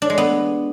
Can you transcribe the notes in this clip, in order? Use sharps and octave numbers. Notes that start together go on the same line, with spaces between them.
D4
G#3
B3